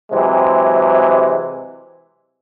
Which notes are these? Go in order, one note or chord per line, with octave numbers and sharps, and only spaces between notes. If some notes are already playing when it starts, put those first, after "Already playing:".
C3 E3 F#3 G#3 C4